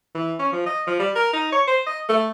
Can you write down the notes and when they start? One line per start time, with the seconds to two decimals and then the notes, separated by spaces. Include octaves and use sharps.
0.15 E3
0.39 C#4
0.52 F3
0.66 D#5
0.87 F3
0.99 G3
1.16 A#4
1.33 D#4
1.52 C#5
1.68 C5
1.87 D#5
2.09 A3